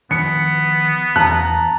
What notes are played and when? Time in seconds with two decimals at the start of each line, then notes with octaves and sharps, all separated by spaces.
0.11 D#3 F3 B3 C#7
1.16 E2 A5 A#5 F#6